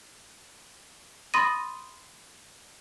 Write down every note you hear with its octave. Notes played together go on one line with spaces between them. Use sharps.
B5 C6 D#6 A6 A#6 D#7